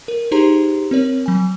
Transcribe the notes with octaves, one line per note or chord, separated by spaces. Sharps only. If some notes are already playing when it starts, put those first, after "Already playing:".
A#4
D#4 G4 G#4 C5 A#5 C6
C4 A#4 C#5
F#3 G#5